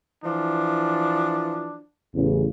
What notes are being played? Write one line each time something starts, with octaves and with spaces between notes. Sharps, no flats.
E3 F3 D4
A1 E2 C#3